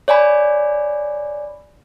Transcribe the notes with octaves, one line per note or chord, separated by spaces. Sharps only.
C#5 D5 G#5 B5